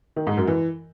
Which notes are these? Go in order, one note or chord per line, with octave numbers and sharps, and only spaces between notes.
D#3
G#2
F#2
E3